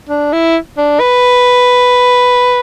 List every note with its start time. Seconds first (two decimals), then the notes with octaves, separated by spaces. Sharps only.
0.09 D4
0.33 E4
0.78 D4
1.00 B4